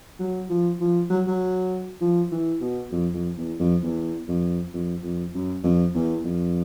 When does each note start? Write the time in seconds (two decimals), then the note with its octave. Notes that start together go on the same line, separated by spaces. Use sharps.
0.19 F#3
0.49 F3
0.81 F3
1.10 F#3
1.27 F#3
2.01 F3
2.31 E3
2.61 B2
2.91 F2
3.14 F2
3.37 E2
3.60 F2
3.83 E2
4.28 F2
4.73 F2
5.03 F2
5.34 F#2
5.64 F2
5.94 E2
6.24 F2